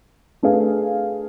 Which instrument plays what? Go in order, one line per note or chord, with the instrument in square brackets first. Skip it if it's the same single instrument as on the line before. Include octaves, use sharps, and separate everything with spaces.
[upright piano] A3 D4 G#4 B4 F5